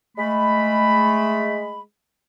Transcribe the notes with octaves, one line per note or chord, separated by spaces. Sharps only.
G#3 A3 B5